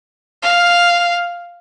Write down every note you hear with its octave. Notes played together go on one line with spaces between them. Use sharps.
F5